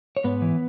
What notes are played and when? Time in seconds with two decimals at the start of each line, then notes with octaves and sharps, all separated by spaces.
0.17 C#5
0.24 G#2 B3 B4
0.42 E3